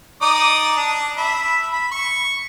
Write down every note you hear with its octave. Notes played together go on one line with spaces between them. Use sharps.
D#4 D5 D#6
D4
E5 B5
B5
C#6